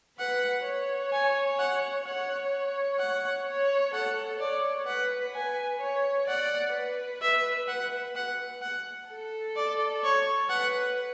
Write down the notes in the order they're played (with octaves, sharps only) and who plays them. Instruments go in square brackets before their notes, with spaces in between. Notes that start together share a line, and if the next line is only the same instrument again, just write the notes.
[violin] B4 [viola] F#5
[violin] C#5
[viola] G#5
F#5
[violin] C#5 [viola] F#5
[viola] F#5
[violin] C#5
[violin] A4 [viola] F#5
[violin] C#5 [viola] D5
[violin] B4 [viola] F#5
[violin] B4 [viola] G#5
[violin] C#5
[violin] D5 [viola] F#5
[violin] B4
[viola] E5
F#5
F#5
F#5
[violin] A4
[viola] D5
C#5
[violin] B4 [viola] F#5